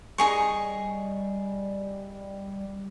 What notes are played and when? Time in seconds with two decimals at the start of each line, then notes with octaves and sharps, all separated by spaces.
0.18 G3 D#4 G#4 C#6